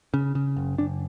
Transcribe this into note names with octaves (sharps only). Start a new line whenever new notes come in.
C#3
C#3
F#1
F#1 D4